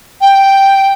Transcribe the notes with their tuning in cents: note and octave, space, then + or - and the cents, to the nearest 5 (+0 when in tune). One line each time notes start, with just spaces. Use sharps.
G5 +0